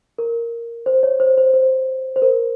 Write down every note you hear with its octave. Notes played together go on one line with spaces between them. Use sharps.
A#4
C5
C#5
C5
C5
C5
C5
A#4